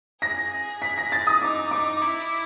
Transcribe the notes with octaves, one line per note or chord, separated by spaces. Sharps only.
G#4 A#6
B6
A#6
A6
D#6
D#4 D6
D#4 D6
E4